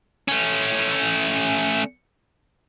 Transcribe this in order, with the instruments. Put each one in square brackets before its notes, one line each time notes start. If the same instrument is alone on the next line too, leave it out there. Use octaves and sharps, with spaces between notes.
[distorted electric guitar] A3 C#4